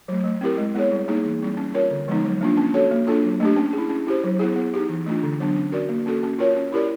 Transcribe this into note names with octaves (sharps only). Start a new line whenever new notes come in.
F#3 A3
A3
C4 E4 G4 A#4
G#3
B3 E4 G#4 C#5
G3
A#3 D#4 G#4
E3
G3 C4 E4
C#4
F4 A#4 C#5
D3
F3 G#3 B3 D#4
F#3
A#3 D4 F4
C#4
F#4 A4 C#5
A#3
D4 F4 A4
F#3
A3 D4 G4
C#4
G#4
E4
C#4
E4 G4 C5
F#3
B3 E4 G#4
B3
D#4 G4
E3
A3 D4 F4
D3
F#3 B3 D4
C#4
F#4 A#4 D5
A#3
C#4 F#4 A4
C#4
F4 A#4 C#5
C#4
E4 G4 A#4 D5